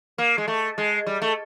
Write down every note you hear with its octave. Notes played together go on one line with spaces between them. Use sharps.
A#3
G#3
A3
G#3
G3
A3